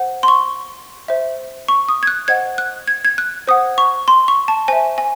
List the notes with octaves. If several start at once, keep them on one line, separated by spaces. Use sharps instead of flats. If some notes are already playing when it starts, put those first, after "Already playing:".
Already playing: C5 F#5
C6
C#6
C5 E5
C#6
D#6
G#6
F#6
C5 D#5 F#5 G#6
F#6
G#6
G#6
F#6
C5 F#5 D#6
C#6
C6
C#6
A5
C5 E5 G#5
G#5